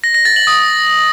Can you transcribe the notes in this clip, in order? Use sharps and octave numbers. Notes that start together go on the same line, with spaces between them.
A#6
A#6
A6
F#7
D#6